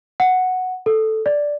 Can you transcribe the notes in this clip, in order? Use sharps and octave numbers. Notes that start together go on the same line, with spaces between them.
F#5
A4
D5